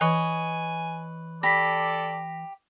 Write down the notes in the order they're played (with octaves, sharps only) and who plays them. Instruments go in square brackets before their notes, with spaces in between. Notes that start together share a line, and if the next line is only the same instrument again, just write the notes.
[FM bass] E3 [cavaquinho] B4 C#5 D#5 [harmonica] G#5
[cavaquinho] G4 B5 [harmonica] A4 D5 [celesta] A#6 B6